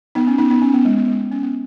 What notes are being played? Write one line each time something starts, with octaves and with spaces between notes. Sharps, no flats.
B3 D#4
C#4
B3 D#4
B3 D#4
C#4
B3
G#3
B3
G#3
C#4
B3